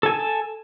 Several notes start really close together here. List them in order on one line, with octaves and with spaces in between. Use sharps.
A4 G#5 A5